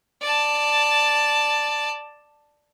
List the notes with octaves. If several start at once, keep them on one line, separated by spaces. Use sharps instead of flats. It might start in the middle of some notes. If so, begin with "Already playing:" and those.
D5 A5